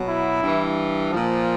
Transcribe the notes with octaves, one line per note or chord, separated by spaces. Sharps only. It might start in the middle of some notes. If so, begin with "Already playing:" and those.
Already playing: B2 F#3
E4
G2 E3
A#2 F3